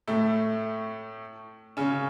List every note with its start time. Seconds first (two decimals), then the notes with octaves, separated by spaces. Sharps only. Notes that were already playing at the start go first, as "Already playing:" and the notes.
0.08 A2 A3
1.77 C#3 C#4